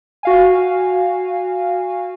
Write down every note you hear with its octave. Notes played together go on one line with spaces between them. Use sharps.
F#4 F5 G#5